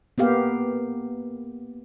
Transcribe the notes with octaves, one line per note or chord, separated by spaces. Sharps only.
A#3 B3 G4 F5